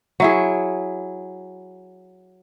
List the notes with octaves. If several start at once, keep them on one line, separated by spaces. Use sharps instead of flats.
F#3 E4 G#4